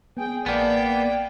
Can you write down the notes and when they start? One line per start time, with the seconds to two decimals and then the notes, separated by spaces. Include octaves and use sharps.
0.17 B3 G#4 G5
0.46 A1 A#3 B3 D5 G5 A5 G6